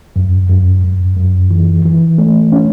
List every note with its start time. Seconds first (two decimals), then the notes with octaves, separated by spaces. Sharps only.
0.16 F#2
0.49 F#2
0.84 F#2
1.17 F#2
1.51 E3
1.85 E3
2.18 A3
2.52 C#4